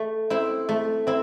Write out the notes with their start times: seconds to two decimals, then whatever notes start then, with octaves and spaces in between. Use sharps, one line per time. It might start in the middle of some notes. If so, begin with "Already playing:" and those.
Already playing: A3
0.30 C4 E4 C5
0.69 A3
1.07 C4 E4